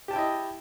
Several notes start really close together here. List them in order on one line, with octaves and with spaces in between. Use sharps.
G4 A5 G5 E4 D#5